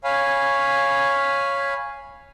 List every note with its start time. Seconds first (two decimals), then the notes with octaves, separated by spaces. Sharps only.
0.04 C#5 F5 G#5 B5